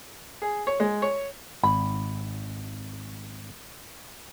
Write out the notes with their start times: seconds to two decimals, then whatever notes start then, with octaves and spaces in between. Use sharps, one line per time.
0.42 G#4
0.67 C#5
0.80 G#3
1.02 C#5
1.63 G#1 B5